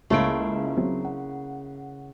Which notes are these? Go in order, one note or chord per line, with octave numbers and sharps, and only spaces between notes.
C#2 C#3 A3 A#3 E4 F4 D7
F#3 C4
F#5